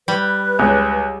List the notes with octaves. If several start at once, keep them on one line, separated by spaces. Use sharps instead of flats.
G3 B4
C#2